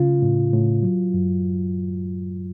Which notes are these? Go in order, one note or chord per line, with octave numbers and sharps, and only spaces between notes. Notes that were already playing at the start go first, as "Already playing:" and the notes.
Already playing: C#3 F4
A2
A2
F#3
F#2